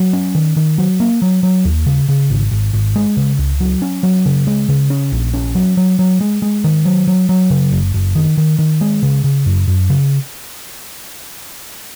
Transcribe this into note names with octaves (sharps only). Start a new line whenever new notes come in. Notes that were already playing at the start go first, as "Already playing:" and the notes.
Already playing: F#3
C#4
D#3
D#3
F#3
A#3
F#3
F#3
D#2
C#3
C#3
G#1
G#1
G#1
G#3
C#3
C#2
F#3
C#4
F#3
C#3
G#3
C#3
C#4
A#1
C#4
F#3
F#3
F#3
G#3
G#3
D#3
F#3
F#3
F#3
C#3
F#1
F#1
D#3
D#3
D#3
G#3
C#3
C#3
F#2
F#2
C#3